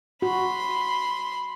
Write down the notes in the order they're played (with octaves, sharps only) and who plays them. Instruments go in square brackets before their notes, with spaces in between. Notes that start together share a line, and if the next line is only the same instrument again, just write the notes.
[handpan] F#4 [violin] B5 C6